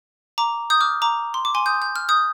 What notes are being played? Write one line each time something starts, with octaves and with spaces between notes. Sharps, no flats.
A#5 D6
D#6 G6
D6 F6
A#5 D6
C6
D6
G#5 C6
D#6 G6
G6
F6
D#6 G6